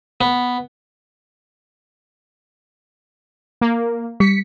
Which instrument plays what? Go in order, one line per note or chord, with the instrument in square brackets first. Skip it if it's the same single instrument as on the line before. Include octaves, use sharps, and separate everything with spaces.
[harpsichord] B3
[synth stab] A#3
[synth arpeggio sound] G3 [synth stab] B6 C#7